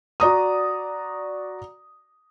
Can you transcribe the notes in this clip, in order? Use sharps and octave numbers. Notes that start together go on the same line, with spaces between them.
F#4 D5 A#5 D#6